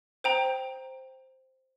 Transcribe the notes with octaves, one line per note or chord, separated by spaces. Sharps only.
C5 G5 A#5